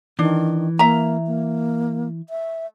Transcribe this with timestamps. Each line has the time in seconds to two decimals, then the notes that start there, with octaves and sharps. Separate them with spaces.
0.19 D#3 E3 D4
0.79 A#3 E5 A#5
1.27 A#3
2.30 E5